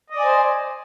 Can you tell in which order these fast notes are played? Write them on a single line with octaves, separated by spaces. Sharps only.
D#5 D5 G#5 C5